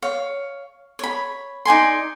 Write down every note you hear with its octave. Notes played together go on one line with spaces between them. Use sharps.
C#5 F5
C#5 B5
D#4 D5 G#5 C6